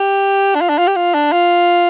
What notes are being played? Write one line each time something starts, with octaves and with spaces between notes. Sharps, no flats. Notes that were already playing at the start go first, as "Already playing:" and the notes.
Already playing: G4
D4
F4
D4
F4
G4
F4
D4
F4